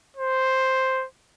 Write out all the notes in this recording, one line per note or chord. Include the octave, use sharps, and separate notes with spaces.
C5